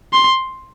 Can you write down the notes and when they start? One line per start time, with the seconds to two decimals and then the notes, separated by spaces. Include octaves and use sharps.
0.13 C6